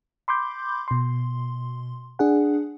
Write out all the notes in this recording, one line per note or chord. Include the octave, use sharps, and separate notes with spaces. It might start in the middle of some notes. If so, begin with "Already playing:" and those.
B5 C6 D6 G6
B2 C6
D4 G#4 F#5